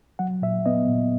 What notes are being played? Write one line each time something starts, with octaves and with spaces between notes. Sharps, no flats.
F#3 F#5
A#2 E5
B3 D#5
A#2